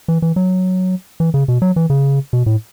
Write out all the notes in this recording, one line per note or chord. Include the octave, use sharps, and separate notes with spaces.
E3
E3
F#3
E3
C#3
B2
F#3
E3
C#3
B2
A2